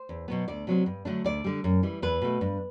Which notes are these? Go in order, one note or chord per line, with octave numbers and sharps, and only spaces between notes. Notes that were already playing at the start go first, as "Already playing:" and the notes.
Already playing: C5
E2
B2 F#3 B3
D2 D5
C3 F#3 C4
G2
D3 F#3 A3 D4
D2 D5
D3 G3
F#2
E3 G3
E2 B4
B2 A3
G2